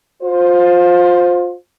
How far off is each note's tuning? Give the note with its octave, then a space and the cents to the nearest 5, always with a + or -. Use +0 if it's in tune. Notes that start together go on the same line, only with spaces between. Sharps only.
F4 +25 C5 +0